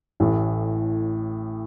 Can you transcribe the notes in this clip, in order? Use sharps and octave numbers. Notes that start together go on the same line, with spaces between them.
A1 A2